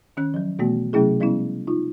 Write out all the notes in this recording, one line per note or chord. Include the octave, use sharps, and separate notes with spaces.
D#3 C#4 F#6
F3 F#3
B2 E3 A3 B3 F#4
C3 F#3 A3 C#4 E4 G#4
F3 G3 B3 C#4 E4
D#4 F4